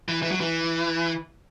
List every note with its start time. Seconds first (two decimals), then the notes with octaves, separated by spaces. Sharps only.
0.09 E3
0.23 E3
0.31 F#3
0.40 E3